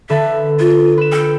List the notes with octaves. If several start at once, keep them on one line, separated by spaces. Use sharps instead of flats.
D3 A4 B4 E5
F4
B4 E7
A4 G5